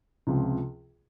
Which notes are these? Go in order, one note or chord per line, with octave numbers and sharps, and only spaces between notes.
C#2 C3 F3